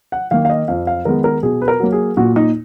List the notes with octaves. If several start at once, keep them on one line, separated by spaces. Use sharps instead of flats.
F#5
D#3 A#3 F5
F5
D#5
F2 F5
F5
D#3 G#3 B3 A#4
A#4
B2 G#4
B4
A#4
F#3 A#3
G#4
A#2 F#4
D#4